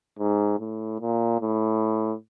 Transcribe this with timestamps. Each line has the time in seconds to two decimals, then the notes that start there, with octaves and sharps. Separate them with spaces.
0.19 G#2
0.59 A2
1.00 A#2
1.41 A2